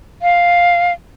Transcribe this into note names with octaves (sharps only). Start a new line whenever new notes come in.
F5